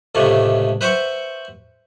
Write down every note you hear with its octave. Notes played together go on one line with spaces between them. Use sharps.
C#2 A2 C3 G#3 A3
B4 C5 E5 F#5 C6 C#6